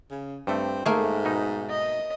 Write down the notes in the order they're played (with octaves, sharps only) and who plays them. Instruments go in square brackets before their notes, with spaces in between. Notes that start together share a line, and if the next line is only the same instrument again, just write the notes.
[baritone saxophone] C#3
[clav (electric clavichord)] G2 A3 [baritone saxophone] C4
[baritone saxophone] G#2 [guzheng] A3 A#3 [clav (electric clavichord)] G#4
[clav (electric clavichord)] B2 D#4
[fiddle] D#5